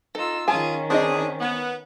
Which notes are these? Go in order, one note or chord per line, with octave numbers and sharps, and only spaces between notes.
D#4 F4 A4 E6
D#3 C#4 F4 G#4 G#5 A5
C4 D4 D#4 G#4 D#5
B3